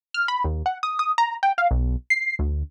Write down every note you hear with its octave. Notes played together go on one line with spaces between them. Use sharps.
F6
B5
D#2
F#5
D#6
D#6
A#5
G5
F5
B1
C7
D2